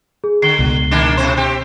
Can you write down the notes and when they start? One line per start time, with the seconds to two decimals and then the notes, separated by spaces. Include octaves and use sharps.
0.24 G#4
0.42 D3 C7 G7
0.59 C#2 B2
0.91 D#3 A#3 D4
1.17 A2 C3 C5
1.37 C4 G4